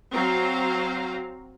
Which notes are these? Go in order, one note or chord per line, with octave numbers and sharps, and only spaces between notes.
F#3 C4 F5 A#5